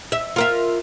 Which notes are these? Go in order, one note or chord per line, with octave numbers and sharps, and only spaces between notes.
E5
F4 A#4 E5